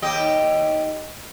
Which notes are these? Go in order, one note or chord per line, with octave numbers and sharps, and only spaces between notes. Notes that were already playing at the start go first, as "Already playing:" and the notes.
D#2 G4 D#5